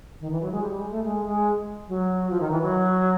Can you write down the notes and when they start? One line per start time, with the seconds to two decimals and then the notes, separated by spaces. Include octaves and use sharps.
0.20 D#3
0.31 E3
0.41 F#3
0.52 G#3
0.62 G3
0.76 G#3
0.90 A3
1.04 G#3
1.25 G#3
1.88 F#3
2.30 F3
2.40 D#3
2.51 E3
2.62 F#3